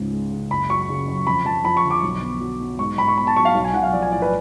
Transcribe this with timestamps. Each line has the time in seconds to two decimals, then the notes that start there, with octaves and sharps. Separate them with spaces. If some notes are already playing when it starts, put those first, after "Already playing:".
Already playing: C#2 G#2 C#4
0.12 G#3
0.31 C#3
0.50 F#1 B5
0.70 F#3 C#6
0.89 C#3
1.08 F#2
1.27 F2 B5
1.45 F2 A5
1.64 F3 B5
1.77 C#6
1.83 D3
1.91 D6
2.02 B1
2.22 B3
2.41 F#3
2.60 B2
2.79 G#2 C#6
2.98 G#2 B5
3.08 C#6
3.17 B3 B5
3.27 A5
3.35 F#3 C#6
3.45 F5
3.55 B1
3.64 G#5
3.74 B1 F#5
3.83 F5
3.93 F3 D5
4.02 G#5
4.12 A2 D5
4.22 B4